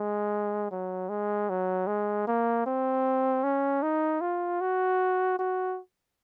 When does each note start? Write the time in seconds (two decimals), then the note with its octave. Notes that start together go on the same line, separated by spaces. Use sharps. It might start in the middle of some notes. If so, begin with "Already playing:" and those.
Already playing: G#3
0.71 F#3
1.09 G#3
1.49 F#3
1.87 G#3
2.27 A#3
2.66 C4
3.44 C#4
3.83 D#4
4.21 F4
4.61 F#4
5.39 F#4